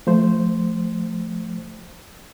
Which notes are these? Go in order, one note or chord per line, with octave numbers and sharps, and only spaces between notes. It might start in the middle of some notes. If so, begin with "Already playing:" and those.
F3 A3 C5